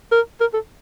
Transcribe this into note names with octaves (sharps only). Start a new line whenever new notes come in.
A#4
A#4
A4